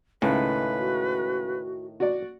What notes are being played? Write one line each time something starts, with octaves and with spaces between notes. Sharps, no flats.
C#2 A2 D#3 A3 B4
F#4
F#4 D5